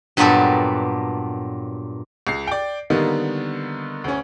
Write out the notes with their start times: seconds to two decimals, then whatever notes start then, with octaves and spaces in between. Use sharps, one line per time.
0.17 G2 A#2 F#3 B3 G4 A4
2.27 C#2 C7
2.47 D5 G5
2.90 D3 D#3 G3 A#3 B3 D#4
4.04 D2 C#4